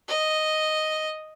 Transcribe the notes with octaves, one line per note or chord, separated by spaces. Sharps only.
D#5